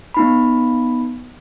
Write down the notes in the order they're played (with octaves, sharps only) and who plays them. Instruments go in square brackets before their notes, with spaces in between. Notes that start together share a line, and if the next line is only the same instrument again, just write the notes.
[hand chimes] B3 D#4 B5